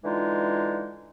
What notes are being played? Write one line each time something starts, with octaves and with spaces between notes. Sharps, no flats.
D3 E3 G#3 D#4 F4